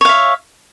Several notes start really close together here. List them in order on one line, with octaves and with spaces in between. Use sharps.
C#5 F5 E5